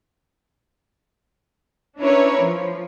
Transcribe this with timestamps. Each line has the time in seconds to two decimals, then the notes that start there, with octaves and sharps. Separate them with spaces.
1.99 C#4 D4 E4 A#4 B4 C#5
2.40 F3